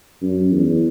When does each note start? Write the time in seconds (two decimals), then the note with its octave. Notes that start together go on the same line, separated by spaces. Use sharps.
0.22 F#2
0.52 E2